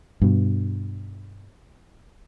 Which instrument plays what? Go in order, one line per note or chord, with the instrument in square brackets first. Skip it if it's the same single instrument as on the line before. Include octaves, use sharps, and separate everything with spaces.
[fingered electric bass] G2 B2